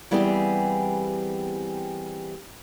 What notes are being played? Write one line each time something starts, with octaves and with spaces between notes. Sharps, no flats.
E3 G3 B3 C4 G4 G#4